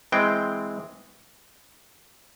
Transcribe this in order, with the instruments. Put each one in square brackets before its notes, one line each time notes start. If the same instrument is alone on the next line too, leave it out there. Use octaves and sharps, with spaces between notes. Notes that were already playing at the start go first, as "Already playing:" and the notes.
[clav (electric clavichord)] E3 G#3 C4 G5